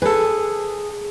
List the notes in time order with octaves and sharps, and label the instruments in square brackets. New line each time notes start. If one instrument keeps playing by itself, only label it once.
[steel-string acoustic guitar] G#4 [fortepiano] A4 B4